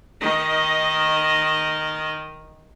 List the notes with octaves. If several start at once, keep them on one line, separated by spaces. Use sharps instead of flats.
D#3 D#5